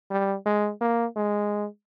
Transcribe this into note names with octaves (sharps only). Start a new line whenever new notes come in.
G3
G#3
A#3
G#3